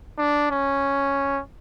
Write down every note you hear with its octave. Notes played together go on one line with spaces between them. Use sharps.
D4
C#4